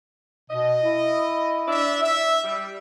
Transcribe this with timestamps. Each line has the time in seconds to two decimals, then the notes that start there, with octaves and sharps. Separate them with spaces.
0.50 B2 D#5
0.83 E4
1.68 D4 D5 E5
2.02 E5
2.44 G3